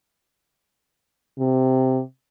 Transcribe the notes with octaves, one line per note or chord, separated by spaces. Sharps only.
C3